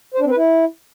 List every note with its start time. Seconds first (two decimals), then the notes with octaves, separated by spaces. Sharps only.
0.14 C5
0.20 D4
0.25 C4
0.31 B4
0.36 E4